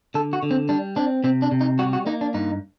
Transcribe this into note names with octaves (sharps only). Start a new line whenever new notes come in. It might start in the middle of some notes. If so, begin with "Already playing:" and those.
D3 A4
F#4
D3
C4
G3 D4
C4 D4
C3 C4
D4
C3
D#4
G3 F#4
F#4
A#3 D#4
D4
G2 D#4